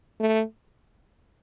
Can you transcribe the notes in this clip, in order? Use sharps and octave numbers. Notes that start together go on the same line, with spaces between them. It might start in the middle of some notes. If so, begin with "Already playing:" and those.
A3